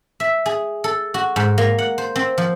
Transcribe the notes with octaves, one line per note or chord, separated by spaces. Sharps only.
E5
G#4
A4
F#4
G#2
A#3
F#5
C5
C4
F3